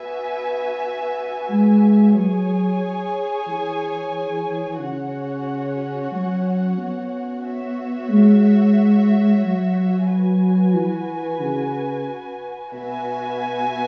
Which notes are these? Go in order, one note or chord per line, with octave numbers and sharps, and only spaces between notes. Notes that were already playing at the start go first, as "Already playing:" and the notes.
Already playing: B3 F#4 E5 G#5
G#3
F#3 G#4 C#5 G#5
E3
C#3 C#4 F#4 C#5 F#5
F#3
B3
F#4 C#5 E5
G#3
F#3
F#4 B4 G#5
E3
C#3
B2 F#4 B4 E5 G#5